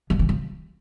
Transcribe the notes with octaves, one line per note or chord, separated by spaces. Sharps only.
F3
E3
F3